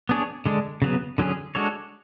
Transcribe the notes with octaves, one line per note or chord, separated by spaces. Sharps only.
B3 D4 G#4 C#5
D3 G#3 D4
C#3 F#3 B3
D3 F#3 C#4 G#4
G#3 D4 F#4 A4 C#5